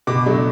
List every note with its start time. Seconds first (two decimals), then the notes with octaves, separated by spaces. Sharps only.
0.07 B2 D6
0.26 F#3 A3 D4